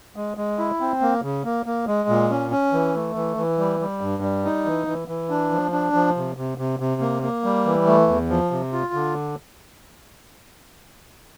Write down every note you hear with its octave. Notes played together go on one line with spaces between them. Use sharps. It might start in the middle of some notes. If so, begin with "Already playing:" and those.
G#3
G#3
E4
C4
A#3
C#3
A#3
A#3
G#3
A#2
C#4
C#4
E3
A3
E3
E3
G3
G3
G2
G3
D#4
E3
E3
E3
D4
F3
D4
F3
C3
C3
C3
C3
A#3
A#3
G3
E3
A3
E2
F3
C3
F4
D3